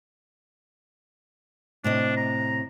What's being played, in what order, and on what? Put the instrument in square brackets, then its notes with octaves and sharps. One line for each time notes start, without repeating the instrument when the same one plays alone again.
[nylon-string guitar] A2 C3 D#5 [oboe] D4
[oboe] A#5